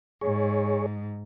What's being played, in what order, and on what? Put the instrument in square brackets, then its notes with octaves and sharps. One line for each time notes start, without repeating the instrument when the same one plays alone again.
[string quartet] G#2 [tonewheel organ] G#4 C#5